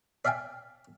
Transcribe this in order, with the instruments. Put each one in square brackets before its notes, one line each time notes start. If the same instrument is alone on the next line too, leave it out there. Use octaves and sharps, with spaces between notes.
[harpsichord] D5 E5 F5 G5 G#5